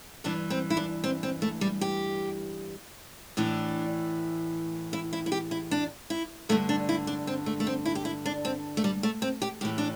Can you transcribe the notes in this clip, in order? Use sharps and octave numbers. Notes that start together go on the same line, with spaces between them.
G2 E3 D4
C4
E4
D4
C4
C4
A3
G3
G4
A2 E3 D4
E4
E4
E4
G4
E4
D4
E4
G2 D3 A3
D4
E4
D4
C4
A3
A3
C4
E4
G4
E4
D4
C4
A3
G3
A3
C4
G4
A2 E3 G4
D4